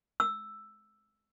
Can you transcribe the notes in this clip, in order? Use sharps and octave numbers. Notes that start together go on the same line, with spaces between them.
E6